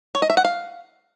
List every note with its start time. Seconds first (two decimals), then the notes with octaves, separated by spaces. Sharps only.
0.15 C#5
0.22 D#5
0.30 E5
0.37 F#5
0.45 F5